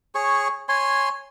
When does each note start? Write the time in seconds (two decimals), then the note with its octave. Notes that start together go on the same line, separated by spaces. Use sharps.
0.15 G#4 C#5 C#6
0.69 C#5 G#5 C6